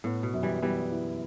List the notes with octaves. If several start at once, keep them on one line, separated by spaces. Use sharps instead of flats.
A2 B3
B2
F#2
E3 G3
E3 G3 B3
E4